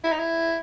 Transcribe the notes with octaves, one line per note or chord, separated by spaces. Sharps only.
E4
D#4
E4